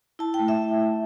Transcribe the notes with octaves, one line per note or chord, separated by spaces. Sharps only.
E4 A5
G5
A3
E5